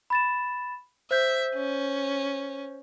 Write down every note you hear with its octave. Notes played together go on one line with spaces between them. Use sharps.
B5 A6 E7
C5 E5 G6
C#4